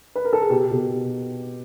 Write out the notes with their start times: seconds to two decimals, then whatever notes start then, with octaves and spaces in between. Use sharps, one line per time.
0.15 B4
0.25 A#4
0.33 A4
0.41 G#4
0.50 B2 G4
0.71 B2